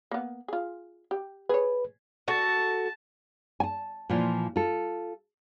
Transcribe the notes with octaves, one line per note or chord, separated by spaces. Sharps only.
A#3 B3
F4 G#4
G4
G#4 B4 C#5
F#4 A4 A5
G#5 A5
A#2 E3 F3 F4
F4 A4